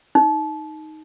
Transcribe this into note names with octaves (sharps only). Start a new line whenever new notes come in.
D#4